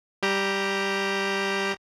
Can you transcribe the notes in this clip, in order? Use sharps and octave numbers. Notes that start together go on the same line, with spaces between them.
G3 G4 A#5